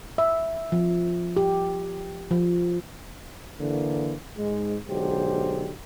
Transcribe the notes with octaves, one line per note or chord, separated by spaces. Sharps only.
E5
F3
G4
F3
D3 E3 A#3
G#2 G#3
B1 D3 F#3 G#3 G4 C5